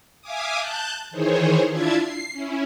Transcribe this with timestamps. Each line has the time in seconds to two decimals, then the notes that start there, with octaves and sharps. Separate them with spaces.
0.21 E5 F5 G#5 D6 D#6
0.57 A5 F#6 G6
1.11 D#3 E3 G#4 C5 C#5
1.68 D4 E4 F4 E5 A5 G#6
1.98 C7
2.32 C#4 E4